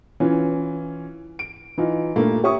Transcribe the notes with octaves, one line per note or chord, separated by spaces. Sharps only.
E3 C#4 F4
D7
E3 D#4 F4
G2 A#2 A3 A#3
G4 C#5 E5 C#6 D#6